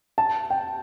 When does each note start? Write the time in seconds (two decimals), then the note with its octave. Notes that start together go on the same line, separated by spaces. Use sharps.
0.18 A5
0.50 G5